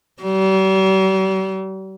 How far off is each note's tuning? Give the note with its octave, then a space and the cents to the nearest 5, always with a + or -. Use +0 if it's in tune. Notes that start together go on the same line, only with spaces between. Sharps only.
G3 -45